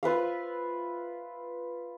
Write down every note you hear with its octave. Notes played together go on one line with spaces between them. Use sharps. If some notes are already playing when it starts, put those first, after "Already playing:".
F4 B4 E5 F5